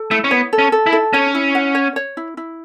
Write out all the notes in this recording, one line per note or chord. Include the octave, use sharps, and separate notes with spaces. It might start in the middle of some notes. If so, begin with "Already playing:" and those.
Already playing: A4
A3 E4
C#4
B3 C#5
A4
C#4
A4
E4
A4
C#4 C#5
E4
F#5
C#5
C#5
E4
E4